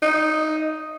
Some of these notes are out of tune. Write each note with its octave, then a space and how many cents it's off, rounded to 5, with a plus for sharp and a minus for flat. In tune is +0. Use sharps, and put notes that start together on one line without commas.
D#4 +0